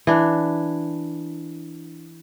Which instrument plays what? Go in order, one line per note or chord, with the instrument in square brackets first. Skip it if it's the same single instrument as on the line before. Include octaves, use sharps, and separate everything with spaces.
[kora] E3 D4